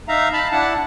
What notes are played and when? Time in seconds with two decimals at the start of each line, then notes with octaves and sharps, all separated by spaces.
0.08 D#4 E5 F5 A#5
0.33 F5 A5 B5
0.52 D4 E4 F#5 A5